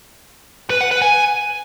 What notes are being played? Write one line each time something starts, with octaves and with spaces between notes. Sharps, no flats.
B4
F#5
B4
G#5